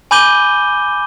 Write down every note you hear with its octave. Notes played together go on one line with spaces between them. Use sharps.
G#5 B5 D6 G6 D#7 G7